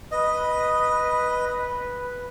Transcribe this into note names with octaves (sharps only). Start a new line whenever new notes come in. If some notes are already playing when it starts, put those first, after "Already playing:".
B4 D#5